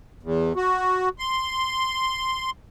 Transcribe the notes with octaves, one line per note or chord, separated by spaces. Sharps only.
E2
F#4
C6